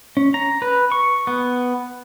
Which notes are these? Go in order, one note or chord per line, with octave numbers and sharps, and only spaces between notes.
C#4
A#5
B4
C#6
B3